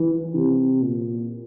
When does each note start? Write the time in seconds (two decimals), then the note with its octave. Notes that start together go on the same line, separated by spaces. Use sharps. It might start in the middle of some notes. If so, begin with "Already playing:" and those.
Already playing: E3
0.35 C3
0.82 A#2